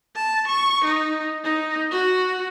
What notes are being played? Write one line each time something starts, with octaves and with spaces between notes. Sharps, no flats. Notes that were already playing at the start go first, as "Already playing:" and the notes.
A5
C#6
D#4
D#4
F#4